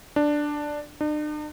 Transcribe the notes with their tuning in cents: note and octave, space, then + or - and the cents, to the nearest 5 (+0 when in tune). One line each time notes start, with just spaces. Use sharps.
D4 +5
D4 +45